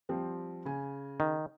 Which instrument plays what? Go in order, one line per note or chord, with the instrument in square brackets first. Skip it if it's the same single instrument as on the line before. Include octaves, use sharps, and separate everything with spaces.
[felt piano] F3 G3 C4
C#3 G#5
[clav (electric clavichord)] D#3